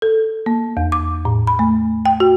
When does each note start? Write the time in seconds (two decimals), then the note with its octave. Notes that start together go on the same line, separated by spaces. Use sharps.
0.02 A4
0.46 A#3
0.77 E2
0.92 D6
1.25 A2
1.47 B5
1.59 A3
2.06 G5
2.20 F#4